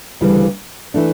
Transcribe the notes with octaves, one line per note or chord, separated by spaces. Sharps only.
D2 C#3 E3 G3
E3 A3 D4